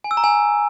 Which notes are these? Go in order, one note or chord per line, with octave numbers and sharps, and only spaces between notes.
G#5
E6
A#5
G#5